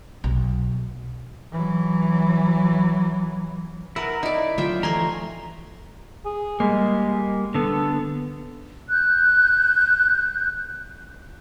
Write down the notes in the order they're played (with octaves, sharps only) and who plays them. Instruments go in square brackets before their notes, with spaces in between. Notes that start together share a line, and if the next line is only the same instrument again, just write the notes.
[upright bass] B1
[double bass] E3 F#3
[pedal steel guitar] E4 A#4 [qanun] B4 F#5
[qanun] D#4 D5 [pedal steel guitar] E4
[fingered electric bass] D3 F#3 A3 [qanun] F4 E5 G5
[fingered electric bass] E3 F3 [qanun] A3 G#5 C6 [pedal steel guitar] A#5
[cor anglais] G#4
[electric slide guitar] G3 A#3 [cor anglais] G#3
[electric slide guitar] D3 B3 [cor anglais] A4
[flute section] F#6 G6